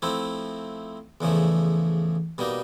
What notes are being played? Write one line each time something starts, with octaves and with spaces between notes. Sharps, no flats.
F3 A3 C4 E4
E2 C#3 F3 A3
B2 G3 A#3 D#4